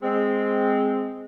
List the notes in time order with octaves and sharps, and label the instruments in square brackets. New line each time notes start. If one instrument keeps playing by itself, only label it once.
[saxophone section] G#3 C4